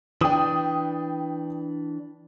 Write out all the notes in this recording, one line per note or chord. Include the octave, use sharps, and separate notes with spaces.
E3 D4 G5 D#6